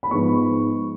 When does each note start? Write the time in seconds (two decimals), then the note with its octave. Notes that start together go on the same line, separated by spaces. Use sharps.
0.03 B5
0.11 G#2 F3 G#3 B3 C#6